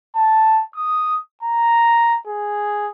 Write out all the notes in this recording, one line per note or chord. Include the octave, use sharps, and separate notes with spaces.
A5
D#6
A#5
G#4